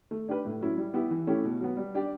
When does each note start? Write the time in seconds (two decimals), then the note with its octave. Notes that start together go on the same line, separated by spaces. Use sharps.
0.11 A3
0.28 D4 G4 B4
0.45 A2
0.61 F#3 C#4 E4
0.77 G3
0.94 B3 E4 G4
1.11 E3
1.27 A3 C#4 E4 G4
1.44 B2
1.60 F#3 B3
1.77 G3
1.94 D4 G4 D5